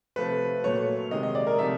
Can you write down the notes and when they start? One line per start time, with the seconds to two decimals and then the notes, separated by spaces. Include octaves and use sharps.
0.16 C3 F3 A3 B4
0.64 A#2 F#3 A3 C#5
1.11 C3 D#3 G#3 D#5
1.23 D#5
1.35 D5
1.47 A#4
1.59 C3 F3 A3 E5